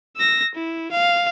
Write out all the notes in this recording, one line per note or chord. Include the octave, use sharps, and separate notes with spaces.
E6 A#6
E4
F5